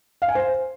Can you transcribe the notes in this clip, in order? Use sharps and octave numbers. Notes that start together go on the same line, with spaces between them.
F5
G#5
C5